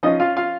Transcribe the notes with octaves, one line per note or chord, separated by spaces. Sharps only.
F3 C#4 D#4 D#5
F4 F5
F4 F5